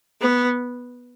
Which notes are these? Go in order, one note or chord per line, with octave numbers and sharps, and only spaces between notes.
B3